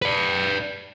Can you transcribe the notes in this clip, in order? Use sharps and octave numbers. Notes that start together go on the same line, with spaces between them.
B4 D5